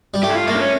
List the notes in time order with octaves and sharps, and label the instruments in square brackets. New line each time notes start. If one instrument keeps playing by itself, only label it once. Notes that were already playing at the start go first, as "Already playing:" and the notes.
[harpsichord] G3
[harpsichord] A3 [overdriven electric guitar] G4
[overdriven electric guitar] E4
F4
[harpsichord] A3 [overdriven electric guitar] A#3
[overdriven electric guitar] D4
C#4